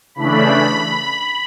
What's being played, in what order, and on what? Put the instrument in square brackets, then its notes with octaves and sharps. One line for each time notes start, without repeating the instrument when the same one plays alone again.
[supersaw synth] C#3 E3 A3 D4 B5